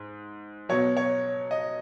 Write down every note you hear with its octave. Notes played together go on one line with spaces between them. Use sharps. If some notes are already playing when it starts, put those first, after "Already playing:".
Already playing: G#2
B2 F#3 C#5
C#5
D#5